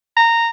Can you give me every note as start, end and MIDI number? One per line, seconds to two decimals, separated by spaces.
0.17 0.49 82